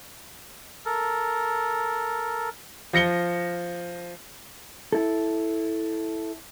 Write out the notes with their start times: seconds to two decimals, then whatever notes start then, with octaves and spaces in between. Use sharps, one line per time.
0.86 A4 A#4
2.93 F3 A#6 C#7 G7
4.93 E4 A4